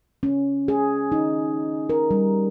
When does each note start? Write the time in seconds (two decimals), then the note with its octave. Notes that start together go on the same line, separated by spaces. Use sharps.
0.23 C#4
0.68 G#4
1.12 D#4
1.89 A#4
2.11 G3